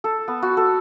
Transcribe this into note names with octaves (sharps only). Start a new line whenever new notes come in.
A4
B3
F#4
A4